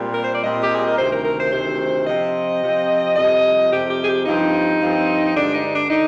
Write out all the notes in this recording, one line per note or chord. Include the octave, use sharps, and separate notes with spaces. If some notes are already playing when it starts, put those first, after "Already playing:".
Already playing: A#2 G3 C4
A#4
C5
D5
A#2 G3 C4 D#5
G4
G#4
A#4
D2 C3 D#3 C5
A#4
A#4
C5
D2 C3 D#3 C5
C3 F3 C4 D#5
C3 F3 C4
F2 C3 G3 D#5
F2 C3 G3 G4
G4
G#4
G4
G2 F3 C4 D#4
G2 F3 C4
G2 D3 G#3 D4
D#4
D4
D3 D#4